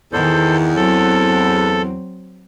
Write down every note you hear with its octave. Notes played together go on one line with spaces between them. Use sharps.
E2 D#3 A4 C5
F#3 C4 A4